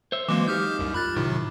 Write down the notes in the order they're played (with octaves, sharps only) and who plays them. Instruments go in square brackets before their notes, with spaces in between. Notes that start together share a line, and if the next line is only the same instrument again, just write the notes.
[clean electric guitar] C5 C#5 E5
[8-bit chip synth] E3 G#3 A#3 [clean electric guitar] F#3 C4 F#4 [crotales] D6
[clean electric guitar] D#4 [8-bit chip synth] G4 F6 G6
[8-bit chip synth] C2 F#2
[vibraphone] F4 [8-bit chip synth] B5 F#6 A6
[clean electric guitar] F#2 D#3 [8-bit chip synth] A2 C3